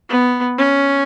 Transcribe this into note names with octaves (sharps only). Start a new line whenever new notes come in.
B3
C#4